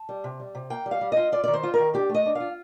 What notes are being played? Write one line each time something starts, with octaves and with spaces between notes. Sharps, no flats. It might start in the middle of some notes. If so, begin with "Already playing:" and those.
Already playing: A5
G3
C3
G3
C3
A#3 G5
G3
F5
G3
F4 D#5
F4 D5
D#3 D5
C5
F4
A#4
D#3
D4 G4
A3
D#5
D4
F4 F5